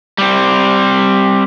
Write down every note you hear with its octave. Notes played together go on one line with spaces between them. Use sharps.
G3 C4